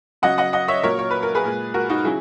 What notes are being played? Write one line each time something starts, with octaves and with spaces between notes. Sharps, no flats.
C#3 F#3 D#5 F#5
D#5 F#5
D#5 F#5
C#5 E5
A#2 F#3 A#4 C#5
C#5
B4
A#4
G#4 B4
A#2 G#3
F#4 A#4
D#4 F#4
C#3 F#3 E4 G#4